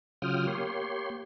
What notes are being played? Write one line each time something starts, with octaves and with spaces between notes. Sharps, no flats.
C#3 F#3 F4 G5 D#6 F6
A#3 G4 C#5 C6